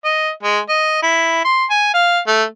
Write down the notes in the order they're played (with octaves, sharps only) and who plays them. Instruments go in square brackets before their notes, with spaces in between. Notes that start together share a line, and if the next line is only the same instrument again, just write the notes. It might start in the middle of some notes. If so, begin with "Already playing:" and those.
[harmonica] D#5
G#3
D#5
E4
C6
G#5
F5
A3